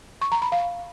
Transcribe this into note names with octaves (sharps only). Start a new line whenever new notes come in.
C#6
A#5
B5
F5